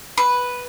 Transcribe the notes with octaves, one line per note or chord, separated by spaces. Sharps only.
B4